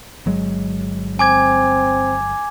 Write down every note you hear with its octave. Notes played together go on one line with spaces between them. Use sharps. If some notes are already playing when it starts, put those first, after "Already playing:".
G1 F#3 G#3
C4 G#5 D6 G#6